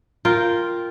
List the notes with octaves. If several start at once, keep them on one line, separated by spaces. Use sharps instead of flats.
F4 A#4 G5